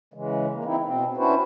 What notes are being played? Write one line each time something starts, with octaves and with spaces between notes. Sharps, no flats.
C#3 E3 G#3
A#3
C4 D#4 E4
B2 C4
C#4 D4 E4 F#4 B4 C5